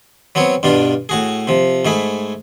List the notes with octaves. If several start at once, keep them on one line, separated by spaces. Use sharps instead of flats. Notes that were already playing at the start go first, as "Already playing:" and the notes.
F#3 B3 C4 C#5
G2 B2 D4 F4
A2 F#4 G#4
C3 F3
G#2 A3 G#4 B5